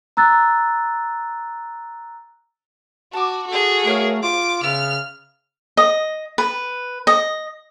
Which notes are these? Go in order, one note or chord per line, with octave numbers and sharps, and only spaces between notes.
A#5 E6 F#6 A6
F#4 A5 D6
F#4 G#4 A4
A3 A#4 C#5 F5
F4 C5 D6
C#3 B3 E5 F6
D#5
B4
D#5